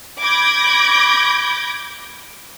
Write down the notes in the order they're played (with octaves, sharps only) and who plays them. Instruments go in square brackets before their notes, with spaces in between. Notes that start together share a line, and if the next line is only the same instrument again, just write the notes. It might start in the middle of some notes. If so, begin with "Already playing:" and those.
[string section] B5 D6 G6 G#6 A#6